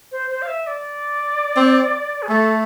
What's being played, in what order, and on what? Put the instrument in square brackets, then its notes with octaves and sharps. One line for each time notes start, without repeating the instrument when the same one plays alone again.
[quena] C5
C5
F5
E5
D5
[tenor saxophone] C4
[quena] G#4
[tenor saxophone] A3 [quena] A4